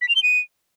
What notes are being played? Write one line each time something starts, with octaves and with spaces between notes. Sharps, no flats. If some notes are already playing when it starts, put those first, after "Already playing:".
B6
F7
G7
D#7